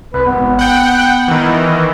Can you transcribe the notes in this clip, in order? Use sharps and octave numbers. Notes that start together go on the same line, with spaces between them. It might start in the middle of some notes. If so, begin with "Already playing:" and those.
C2 B4
G#1 B3
F#5 G5
D#3 E3